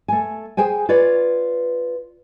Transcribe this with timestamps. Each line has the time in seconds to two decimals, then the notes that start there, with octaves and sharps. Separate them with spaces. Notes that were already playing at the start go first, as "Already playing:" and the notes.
0.08 A3 G#5
0.57 G#4 C5 G5 G#5
0.89 F4 B4 C#5 D5